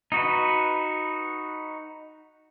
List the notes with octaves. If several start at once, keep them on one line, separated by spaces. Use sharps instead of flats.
D#4 F#4 B4